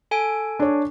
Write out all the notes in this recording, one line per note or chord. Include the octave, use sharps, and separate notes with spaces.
A4 G#5 D7
D4 C#5